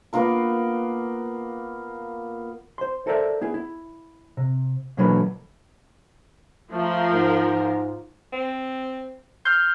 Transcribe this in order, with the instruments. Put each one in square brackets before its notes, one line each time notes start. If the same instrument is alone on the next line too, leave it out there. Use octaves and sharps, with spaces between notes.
[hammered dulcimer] A#3 B3 F4 A#4
[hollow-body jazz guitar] C5 C6
A4 A#4 C5 D5 E5
B3 E4 G#4
E4
C3
B2 D3 E3 F#3 A#3 B4
[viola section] F3 A#4 [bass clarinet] A3
[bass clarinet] G#2
[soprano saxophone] C4
[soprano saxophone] C6 [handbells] F6 G6